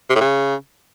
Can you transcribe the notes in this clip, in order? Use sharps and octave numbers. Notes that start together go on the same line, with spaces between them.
C3
A2
C#3